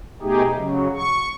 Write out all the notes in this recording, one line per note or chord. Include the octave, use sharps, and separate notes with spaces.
B2 A3 D#4 G4 G#4
C#3 F#3
C#6